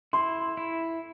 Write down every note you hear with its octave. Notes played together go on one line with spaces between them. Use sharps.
E4 C6
E4